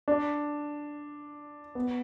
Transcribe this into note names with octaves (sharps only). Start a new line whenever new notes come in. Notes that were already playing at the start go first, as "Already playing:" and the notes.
D4
B3